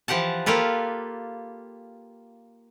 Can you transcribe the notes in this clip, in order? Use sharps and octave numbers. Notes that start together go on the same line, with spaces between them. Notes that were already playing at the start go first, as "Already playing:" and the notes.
E3 F3 G4 F#5 A5
A#3 F4 G4 A4 B4